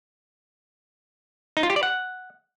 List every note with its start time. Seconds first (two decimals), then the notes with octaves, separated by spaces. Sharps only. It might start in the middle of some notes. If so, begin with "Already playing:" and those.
1.57 D#4
1.63 F4
1.70 G4
1.76 D5
1.83 F#5